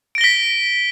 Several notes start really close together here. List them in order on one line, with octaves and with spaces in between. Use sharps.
D7 A#6 G7 B6